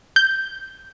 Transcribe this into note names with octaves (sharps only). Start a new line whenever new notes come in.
G6